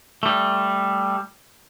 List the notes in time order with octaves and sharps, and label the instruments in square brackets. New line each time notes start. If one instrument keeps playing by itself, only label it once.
[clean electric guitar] G3 A3